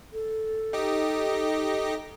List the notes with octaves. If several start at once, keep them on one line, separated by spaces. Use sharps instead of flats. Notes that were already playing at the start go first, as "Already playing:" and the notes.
A4
D#4 G4 D#5